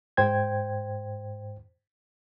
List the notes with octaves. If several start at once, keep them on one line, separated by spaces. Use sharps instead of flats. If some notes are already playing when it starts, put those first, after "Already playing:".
G#2 C5 G5 G#6